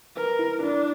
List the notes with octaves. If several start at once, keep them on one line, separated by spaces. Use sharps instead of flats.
A#4 B4
E4
D4 E4